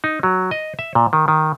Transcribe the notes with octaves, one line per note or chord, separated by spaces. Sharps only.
D#4
F#3
D#5
E5
A#2
D#3
D#3